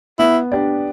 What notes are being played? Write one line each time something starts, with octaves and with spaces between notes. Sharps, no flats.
B3 E4
D4 G4 D5